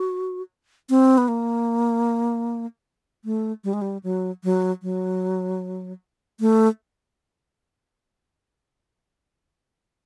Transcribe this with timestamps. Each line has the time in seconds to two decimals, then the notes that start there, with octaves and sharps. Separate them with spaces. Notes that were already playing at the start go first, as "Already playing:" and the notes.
Already playing: F#4
0.90 C4
1.18 B3
1.28 A#3
3.25 A3
3.64 G3
3.73 G#3
3.82 G3
4.03 F#3
4.44 F#3
4.83 F#3
6.40 A3